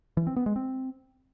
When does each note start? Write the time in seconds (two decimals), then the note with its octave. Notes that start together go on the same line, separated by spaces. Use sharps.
0.17 E3
0.27 C4
0.36 B3
0.46 G#3
0.56 C4